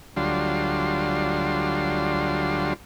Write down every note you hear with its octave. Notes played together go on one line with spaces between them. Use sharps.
D2 F#3 G3 D4 F4 C6